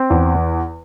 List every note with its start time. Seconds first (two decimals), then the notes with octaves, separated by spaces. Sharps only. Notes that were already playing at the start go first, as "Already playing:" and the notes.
Already playing: C4
0.10 E2